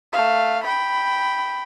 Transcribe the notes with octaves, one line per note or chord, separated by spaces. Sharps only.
A3 F5
G5 B5